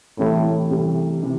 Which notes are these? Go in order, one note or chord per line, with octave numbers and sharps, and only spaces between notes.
C2 A2 C3 E3 A3
C2 C3 E3 A3
C3 E3